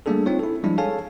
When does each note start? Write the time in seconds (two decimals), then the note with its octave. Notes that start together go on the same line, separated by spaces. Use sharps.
0.06 G3 A3 A#3 D4 G#4 A4
0.26 C4 D#4 F4 C#5
0.39 E4 A4
0.63 F3 G3 G#3 D4 E4
0.78 G#4 A4 C#5 F5 G#5 A5